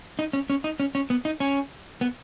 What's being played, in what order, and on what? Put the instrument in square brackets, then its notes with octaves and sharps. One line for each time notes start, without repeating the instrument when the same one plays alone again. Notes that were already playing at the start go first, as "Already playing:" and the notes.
[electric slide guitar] D#4
C#4
C#4
D#4
C#4
C#4
B3
D#4
C#4
B3